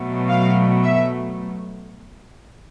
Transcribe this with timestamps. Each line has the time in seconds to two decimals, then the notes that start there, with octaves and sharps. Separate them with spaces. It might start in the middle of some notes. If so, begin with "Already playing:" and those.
Already playing: B2 F#3 A3
0.28 F5
0.83 E5